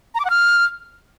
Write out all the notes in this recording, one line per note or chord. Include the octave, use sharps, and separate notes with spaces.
A#5
D6
F#5
F6